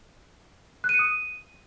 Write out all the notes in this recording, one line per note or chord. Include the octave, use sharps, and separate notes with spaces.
F#6
D#7
C#7
D#6
D#7